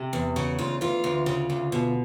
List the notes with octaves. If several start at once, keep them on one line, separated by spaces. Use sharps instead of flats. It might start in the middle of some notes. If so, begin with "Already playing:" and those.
Already playing: C3
E2
C#3 F#4
D2 F4
E3 F4
D2
C#3
D2
B2